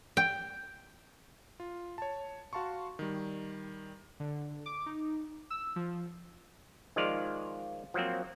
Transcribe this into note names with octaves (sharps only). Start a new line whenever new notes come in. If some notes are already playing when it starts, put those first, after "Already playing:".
G5
F4
C#5 A5
F#4 F5 A5 C6 C#6
D#3 G3
D3
D6
D#4
E6
F3
D#3 F3 G#3 F4 D5 F5
F3 F#3 A#3 C4